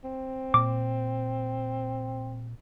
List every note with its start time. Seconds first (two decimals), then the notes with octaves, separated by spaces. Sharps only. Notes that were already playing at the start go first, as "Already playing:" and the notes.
0.04 C4
0.54 A#2 D6